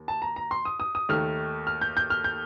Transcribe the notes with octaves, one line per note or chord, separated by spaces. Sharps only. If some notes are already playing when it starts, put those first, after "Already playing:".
Already playing: D#2
A5
A#5
A#5
C6
D#6
D#6
D#6
D#2 D#3 A3 F6
F6
G6
G6
F6
G6